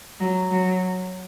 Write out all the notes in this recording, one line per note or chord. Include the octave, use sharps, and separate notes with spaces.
F#3
F#3